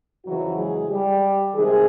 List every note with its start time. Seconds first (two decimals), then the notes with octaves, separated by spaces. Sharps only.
0.24 F2 C#3 E3 F#3 F#4
0.57 G#3 G#4
0.90 G3 G4
1.55 C3 D#3 G#3 G#4